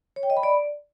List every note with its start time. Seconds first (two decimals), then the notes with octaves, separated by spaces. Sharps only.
0.16 C#5
0.23 G5
0.30 D#5
0.37 B5
0.43 D5